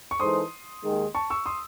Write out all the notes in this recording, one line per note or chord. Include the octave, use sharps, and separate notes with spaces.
C#6
E3 G#3 D#4 A4 C5 C6 D#6
D#2 D#3 G#3
A5 C#6
C#6 E6
C6 D#6